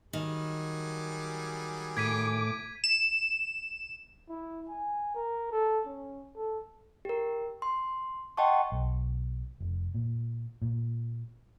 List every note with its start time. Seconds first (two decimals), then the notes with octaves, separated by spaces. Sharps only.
0.13 D#3 F#3 G3 G#4
1.97 A2 D6 G#6 B6 D#7
2.84 E7
4.29 E4
4.69 G#5
5.16 A#4
5.51 A4
5.86 C#4
6.36 A4
7.05 G4 A#4
7.62 C6
8.37 D#5 F#5 G5 A5 C6 C#6
8.72 B1
9.60 F1
9.95 A#2
10.62 A#2